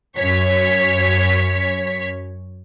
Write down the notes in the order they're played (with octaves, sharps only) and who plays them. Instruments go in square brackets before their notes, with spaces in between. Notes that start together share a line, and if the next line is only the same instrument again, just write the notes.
[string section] F#2 C#5 B6